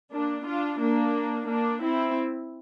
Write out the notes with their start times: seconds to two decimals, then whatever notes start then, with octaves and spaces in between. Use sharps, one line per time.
0.11 A#3 D4
0.46 D4 F4
0.80 A#3 D4
1.48 A#3 D4
1.83 C4 E4